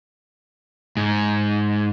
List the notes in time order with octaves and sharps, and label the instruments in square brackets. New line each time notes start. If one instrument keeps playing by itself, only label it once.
[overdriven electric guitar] G#2